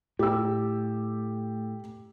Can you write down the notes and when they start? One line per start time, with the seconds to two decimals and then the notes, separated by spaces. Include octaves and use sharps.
0.19 A2 G4 E6